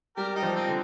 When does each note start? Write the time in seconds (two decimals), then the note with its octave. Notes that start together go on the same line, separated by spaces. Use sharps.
0.17 G3 G4 A#4
0.36 D#4 G4
0.42 F3
0.55 C4 D#4
0.68 D3